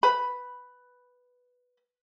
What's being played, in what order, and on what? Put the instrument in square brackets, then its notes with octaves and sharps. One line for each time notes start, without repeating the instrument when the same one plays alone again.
[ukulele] B4 B5